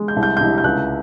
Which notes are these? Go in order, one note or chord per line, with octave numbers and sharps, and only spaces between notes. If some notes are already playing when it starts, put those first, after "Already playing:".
Already playing: G#3
G6
C2
G6
C2 G6
G6
C#2 F#6